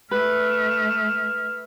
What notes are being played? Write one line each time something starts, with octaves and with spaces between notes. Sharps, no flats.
A3 B4 E5 F6